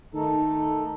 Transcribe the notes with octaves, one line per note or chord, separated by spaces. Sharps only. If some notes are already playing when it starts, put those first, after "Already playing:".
D#3 A3 D#4 A4